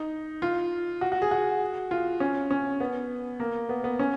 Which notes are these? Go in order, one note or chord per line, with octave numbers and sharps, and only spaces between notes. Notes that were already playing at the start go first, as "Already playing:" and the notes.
Already playing: D#4
F4
F#4
F#4
G#4
F#4
F4
C#4
C#4
B3
A#3
B3
B3
C#4